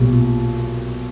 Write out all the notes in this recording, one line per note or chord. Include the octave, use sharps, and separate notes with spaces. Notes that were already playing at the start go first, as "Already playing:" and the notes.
Already playing: B1 A#2 G3